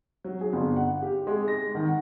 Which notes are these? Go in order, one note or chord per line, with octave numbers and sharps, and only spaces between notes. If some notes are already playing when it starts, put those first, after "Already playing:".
F#3
G#4
G1
F#5
G4
G#3
A#6
D#3
F#5